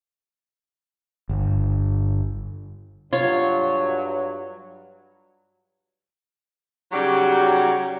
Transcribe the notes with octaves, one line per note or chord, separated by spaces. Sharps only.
G1
G2 F#3 F4 C#5
C#3 F#3 G3 D#4 F#4 G4